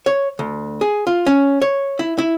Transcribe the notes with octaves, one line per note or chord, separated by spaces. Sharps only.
C#5
D2
G#4
F4
C#4
C#5
E4
E4